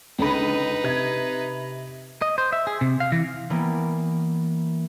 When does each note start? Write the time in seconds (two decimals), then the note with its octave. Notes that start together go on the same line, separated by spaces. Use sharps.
0.19 C#2 D3 D#4 B4 B5
0.83 C3 G#6
2.22 D#5
2.38 C5
2.53 E5
2.67 G#4
2.81 C3
3.00 F5
3.12 E3
3.50 E3 G3 A#3 B3